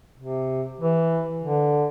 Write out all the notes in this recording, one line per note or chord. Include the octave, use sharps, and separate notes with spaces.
C3
E3
D3